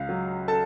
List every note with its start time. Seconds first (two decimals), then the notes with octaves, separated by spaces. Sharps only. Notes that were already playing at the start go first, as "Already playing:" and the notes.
Already playing: C#2 F5
0.09 F#3
0.48 A4 A5